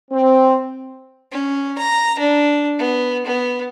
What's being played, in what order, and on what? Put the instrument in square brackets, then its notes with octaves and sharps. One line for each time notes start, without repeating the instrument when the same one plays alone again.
[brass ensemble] C4
[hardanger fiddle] C#4
A#5
D4
B3
B3